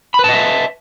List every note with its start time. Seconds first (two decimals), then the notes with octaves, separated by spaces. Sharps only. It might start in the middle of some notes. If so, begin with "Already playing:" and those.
0.14 B5
0.19 B4
0.24 A5
0.29 D#5
0.34 E5